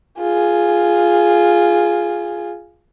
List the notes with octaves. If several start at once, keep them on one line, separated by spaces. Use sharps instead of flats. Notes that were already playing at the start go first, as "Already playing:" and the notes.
F4 G#4